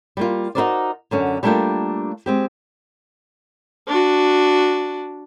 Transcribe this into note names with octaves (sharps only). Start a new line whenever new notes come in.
G3 A#3 F4
D#4 F4 F#4 A#4 C5 D5
F#2 D3 C#4
G3 A3 A#3 D4 F4 G5
G#3 C4 G4
D4 F#4